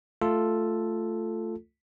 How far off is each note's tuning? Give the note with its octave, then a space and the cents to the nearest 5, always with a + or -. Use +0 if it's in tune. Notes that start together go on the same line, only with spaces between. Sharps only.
A3 +5 F4 +0 A4 +0